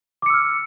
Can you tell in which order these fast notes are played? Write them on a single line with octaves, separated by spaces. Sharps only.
D6 C#7 E6 F6